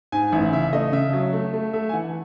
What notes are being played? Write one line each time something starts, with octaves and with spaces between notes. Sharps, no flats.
G#2 G#5
A1 E5
C#3 E5
A3 D#5
C#3 E5
F#3
A3
A3
A3 E5
G#5
E3 F#5